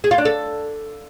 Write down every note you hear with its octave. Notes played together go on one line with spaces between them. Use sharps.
G#4
F4
D4
A4